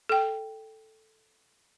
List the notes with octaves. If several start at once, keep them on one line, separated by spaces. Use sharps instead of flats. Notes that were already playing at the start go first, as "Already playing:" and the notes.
A4 G5